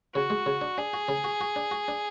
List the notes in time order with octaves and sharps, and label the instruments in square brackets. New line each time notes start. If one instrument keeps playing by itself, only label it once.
[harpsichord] C#3 [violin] F#4
[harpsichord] G#3
C#3
D4
[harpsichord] D4 [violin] G#4
[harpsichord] F#4
C#3
F#4
F#4
D4
F#4
D4